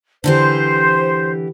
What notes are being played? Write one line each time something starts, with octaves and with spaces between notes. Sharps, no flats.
D3 E3 G4 C5